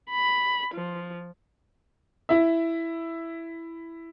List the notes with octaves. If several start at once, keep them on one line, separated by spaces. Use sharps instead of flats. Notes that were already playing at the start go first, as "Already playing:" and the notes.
B5
F3
E4 E5